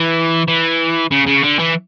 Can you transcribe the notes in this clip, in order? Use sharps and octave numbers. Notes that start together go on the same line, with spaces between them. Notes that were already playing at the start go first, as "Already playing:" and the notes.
Already playing: E3
E3
C#3
C#3
D3
E3